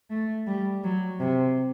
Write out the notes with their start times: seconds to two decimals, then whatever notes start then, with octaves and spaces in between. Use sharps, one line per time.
0.10 A3
0.47 G3
0.84 F#3
1.19 C3